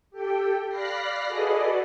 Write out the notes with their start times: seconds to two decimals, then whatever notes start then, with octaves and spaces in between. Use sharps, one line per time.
0.11 G4 A4 G5
0.68 D5 F5 B5 F#6 A#6 C7
1.26 F#4 G#4 A4 B4 D5 D#5